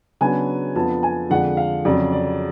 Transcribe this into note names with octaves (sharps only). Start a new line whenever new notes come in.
C#3 F#3 B3 D4 G#5
F2 F3 B3 D4 A5
G#5
F2 D3 G#3 D4 F4 F#5
F5
F2 C#3 F#3 D5
D5